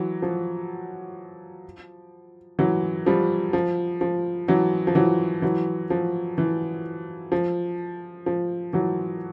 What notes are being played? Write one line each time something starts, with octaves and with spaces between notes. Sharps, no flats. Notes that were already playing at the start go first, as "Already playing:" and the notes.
Already playing: E3 F#3
F3
E3 F#3
F3 G3
F3
F3
E3 F#3
F3
E3 F#3
E3 F#3
F3
E3
F3
F3
E3 F#3